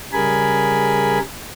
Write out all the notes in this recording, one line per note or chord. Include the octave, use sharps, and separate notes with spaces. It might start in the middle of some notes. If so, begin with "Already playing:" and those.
C#3 G3 G#4 A#4 G#5 B5